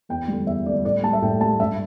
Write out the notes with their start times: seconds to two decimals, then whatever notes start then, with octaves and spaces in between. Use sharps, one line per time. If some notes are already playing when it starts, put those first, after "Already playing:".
0.09 E2 G5
0.28 D3 G3
0.47 E2 E5
0.66 D3 G3 D5
0.85 A2 D5
1.03 G3 A5
1.13 E5
1.22 A2 G5
1.40 G3 A5
1.60 G2 E5